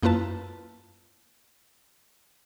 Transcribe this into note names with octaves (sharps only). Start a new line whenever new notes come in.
F#2 A#3 E4 F4 B4 A5